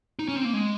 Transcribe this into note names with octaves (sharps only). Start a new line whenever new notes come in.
D#4
C#4
C4
A#3
G#3